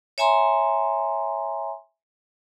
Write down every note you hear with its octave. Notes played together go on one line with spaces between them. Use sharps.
C#5 E5 G#5 A#5 C6